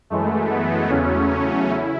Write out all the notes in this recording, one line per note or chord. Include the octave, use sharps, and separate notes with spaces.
F#2 E3 G#3 A3
B3
E2 C#3 F#3 A3 C#4
C#4
E4